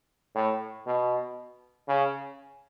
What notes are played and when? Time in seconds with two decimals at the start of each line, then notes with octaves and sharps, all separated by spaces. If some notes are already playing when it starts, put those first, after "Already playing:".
0.35 A2
0.86 B2
1.88 C#3